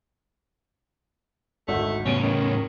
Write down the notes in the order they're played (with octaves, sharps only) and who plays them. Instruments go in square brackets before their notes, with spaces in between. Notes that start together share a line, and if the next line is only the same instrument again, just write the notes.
[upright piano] G#1 D2 F#4 [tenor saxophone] A3
[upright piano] E2 D7 D#7 [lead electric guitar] A2 C#3 [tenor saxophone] C#4
[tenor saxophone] D#3 [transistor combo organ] C#4